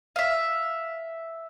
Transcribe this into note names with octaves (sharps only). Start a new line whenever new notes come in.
E5 F5